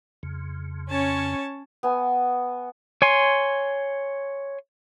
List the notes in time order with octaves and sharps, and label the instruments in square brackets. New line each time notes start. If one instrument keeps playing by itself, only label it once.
[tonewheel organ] F2 C#3
[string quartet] C#4 [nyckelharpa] C#5 A5
[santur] B3 G#5
[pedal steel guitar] C#5 G#5 C6